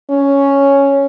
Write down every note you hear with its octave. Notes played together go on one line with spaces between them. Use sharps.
C#4